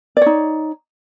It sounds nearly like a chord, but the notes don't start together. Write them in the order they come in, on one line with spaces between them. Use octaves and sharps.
D5 C#5 D#4